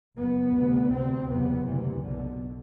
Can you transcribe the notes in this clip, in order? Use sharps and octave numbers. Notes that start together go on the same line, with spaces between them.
F#1 F#2 B3
D2 C3
D2 C3 C4
F#1 E2 C3 B3
D2 C3 E3
B1 B2 D3